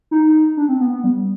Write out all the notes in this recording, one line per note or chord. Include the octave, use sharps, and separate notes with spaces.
D#4
D4
C4
B3
B3
G3